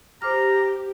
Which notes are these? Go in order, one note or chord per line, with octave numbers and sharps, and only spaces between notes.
G4 C5 A#5 D6 F6